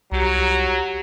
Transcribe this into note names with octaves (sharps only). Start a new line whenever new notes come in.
C2 F#3 G4 A#5